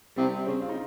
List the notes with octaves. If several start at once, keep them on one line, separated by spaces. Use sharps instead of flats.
C3 G3
C#3 C4
F4
D#4